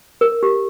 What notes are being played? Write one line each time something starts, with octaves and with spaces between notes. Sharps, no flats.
A#4
G4